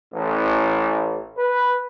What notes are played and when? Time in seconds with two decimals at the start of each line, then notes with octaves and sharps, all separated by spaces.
0.13 A1
1.37 B4